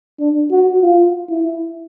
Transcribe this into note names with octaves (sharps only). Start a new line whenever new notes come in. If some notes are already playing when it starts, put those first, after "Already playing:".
D4
F#4
F4
E4